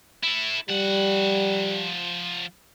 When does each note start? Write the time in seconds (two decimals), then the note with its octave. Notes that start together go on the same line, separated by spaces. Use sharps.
0.24 E4 A4
0.69 F3 G3 F#5